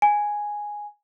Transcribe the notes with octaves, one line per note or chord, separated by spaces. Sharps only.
G#5